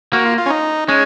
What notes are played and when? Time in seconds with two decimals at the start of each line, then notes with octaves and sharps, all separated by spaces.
0.13 A#3 F#4
0.25 F4
0.38 F4
0.46 C#4
0.50 D#4
0.88 G#3 C#4